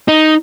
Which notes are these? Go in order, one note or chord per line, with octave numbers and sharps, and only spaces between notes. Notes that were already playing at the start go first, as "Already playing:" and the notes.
D#4